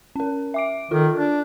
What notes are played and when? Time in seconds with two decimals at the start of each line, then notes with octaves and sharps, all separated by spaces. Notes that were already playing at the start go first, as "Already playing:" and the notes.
0.16 C#4 A#4
0.54 E5 D6 D7
0.91 D#3 F4 A4
1.14 D4